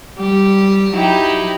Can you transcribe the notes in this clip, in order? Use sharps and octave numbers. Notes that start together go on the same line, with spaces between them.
G3 G4
F#3 D#4 E4 G4